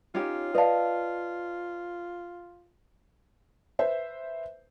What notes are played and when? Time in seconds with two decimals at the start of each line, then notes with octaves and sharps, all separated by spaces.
0.15 C#4 D#4 F4 G4
0.55 B4 D5 D#5 F5 A5
3.79 B4 C5 E5